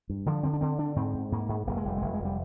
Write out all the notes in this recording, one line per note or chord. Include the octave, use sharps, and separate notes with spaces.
G2
D3 F3
D3 C4
D4
D3 C4
D3 D4
G#2 C4
G#2
G#2 A#3
G#2
F1 A#3
G#3
F1 G3
F1 G#3
G#3
F1
G3